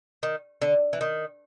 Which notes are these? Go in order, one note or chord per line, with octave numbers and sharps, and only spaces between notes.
D#3
D3
E3
D#3